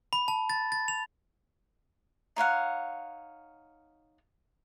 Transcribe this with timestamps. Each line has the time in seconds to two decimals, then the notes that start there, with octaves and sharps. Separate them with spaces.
0.13 B5
0.28 A5
0.50 A6
0.72 A6
0.88 F7
2.36 D#4 C#5 F5 F#5